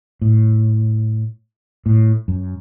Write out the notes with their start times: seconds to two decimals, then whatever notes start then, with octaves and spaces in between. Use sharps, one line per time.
0.22 A2
1.86 A2
2.28 F#2